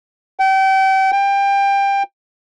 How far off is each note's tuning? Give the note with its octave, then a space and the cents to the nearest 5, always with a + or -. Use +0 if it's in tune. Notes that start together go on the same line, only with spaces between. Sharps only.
G5 -35
G5 +20